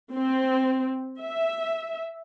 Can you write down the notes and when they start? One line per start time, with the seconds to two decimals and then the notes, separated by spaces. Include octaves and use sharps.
0.13 C4
1.21 E5